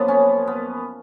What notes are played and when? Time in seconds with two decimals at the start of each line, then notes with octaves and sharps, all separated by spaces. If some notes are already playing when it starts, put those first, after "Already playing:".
Already playing: F#2 F3 A#3 B3
0.08 C#4
0.47 B3